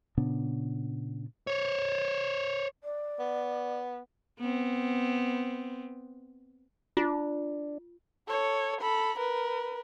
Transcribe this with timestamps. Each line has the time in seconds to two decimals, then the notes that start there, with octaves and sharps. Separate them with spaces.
0.17 A#2 C#3 B3 D4
1.47 C5 C#5
2.84 D5
3.19 B3
4.40 B3 C4
6.97 D4 F4
8.27 A4 C#5
8.81 A4 B5
9.18 A#4 B4